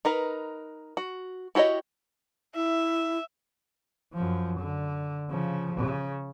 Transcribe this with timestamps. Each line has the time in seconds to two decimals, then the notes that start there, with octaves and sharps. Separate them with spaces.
0.05 D#4 A#4 B4
0.97 F#4
1.55 E4 F#4 G4 C#5 D#5
2.55 E4 E5
4.14 F#2 F3
4.59 D3
5.30 C#3 F3
5.74 C#3